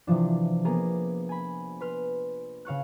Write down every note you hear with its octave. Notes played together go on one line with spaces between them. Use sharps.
C3 E3 F3 D4
A#3 B3 G#4 A#4
G#5 B5
B4 C6 F6
C#3 F5 C#6 F#6